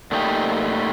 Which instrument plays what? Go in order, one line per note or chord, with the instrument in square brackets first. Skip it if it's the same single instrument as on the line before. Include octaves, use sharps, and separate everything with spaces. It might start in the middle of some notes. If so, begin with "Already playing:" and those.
[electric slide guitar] A#2 A3 D#4 G4